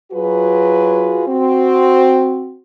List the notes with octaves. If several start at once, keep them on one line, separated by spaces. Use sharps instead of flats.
F#3 F4 F#4 G#4 B4
C4 F#4